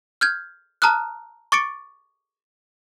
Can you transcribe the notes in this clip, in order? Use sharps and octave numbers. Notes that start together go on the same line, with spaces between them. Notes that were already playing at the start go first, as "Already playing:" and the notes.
F6 G6 G#6
A5 A#5 D#6 F6 F#6
C#6 D6 A6 C#7 D7